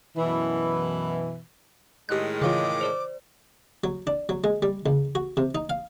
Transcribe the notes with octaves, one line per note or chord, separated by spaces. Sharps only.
F#2 B2 E3
A2 D#3 G#3 G4 F#6
C#3 E3 F4 C#5 F5 G5 D6
C5 D5
F#3
D4
F#3
G#3
G3
C#2
F#4
C3
D#4
F5